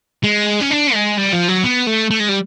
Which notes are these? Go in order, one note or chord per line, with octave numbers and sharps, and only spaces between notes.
G#3
C#4
D4
G#3
G3
F3
F#3
B3
A3
A3
G#3
G3